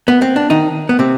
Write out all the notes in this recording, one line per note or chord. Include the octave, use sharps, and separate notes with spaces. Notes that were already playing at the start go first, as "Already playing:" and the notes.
B3
C4
D4
D#3 D#4
B3
C3 C4